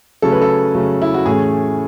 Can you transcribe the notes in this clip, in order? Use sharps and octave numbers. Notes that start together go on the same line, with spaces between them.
C#3 F#3 A3 C#4 A4
B4
A4
C#3 F#3 A3 C#4
E4
F#4
A2 E3 A3 C#4 G#4